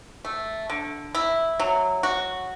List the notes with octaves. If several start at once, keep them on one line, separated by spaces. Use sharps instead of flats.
A3
D3
E4
F#3
F#4